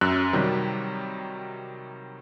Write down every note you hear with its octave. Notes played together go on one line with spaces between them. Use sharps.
F#2 E6 F#6
C3 D#3 F#3 G3